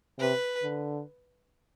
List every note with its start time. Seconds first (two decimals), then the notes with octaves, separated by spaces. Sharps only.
0.19 C3 B4
0.63 D3